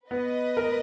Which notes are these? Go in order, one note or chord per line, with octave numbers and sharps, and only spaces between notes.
B3 B4 D#5
A#4